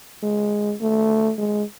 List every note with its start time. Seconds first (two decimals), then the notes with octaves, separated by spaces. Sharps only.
0.23 G#3
0.81 A3
1.38 G#3